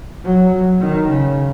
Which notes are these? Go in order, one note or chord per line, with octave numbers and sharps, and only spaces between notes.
F#3
D#3
C#3